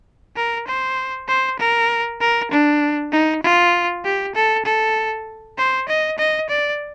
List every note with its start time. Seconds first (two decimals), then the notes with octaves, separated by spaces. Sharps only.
0.36 A#4
0.67 C5
1.28 C5
1.59 A#4
2.21 A#4
2.51 D4
3.12 D#4
3.43 F4
4.04 G4
4.35 A4
4.65 A4
5.58 C5
5.88 D#5
6.18 D#5
6.49 D5